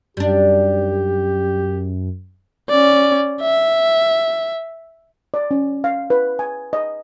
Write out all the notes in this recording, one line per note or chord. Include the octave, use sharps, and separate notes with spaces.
F#2 G3 D4 G4
C#4 D5
E5
D5
C#4
F5
B4
G#5
D#5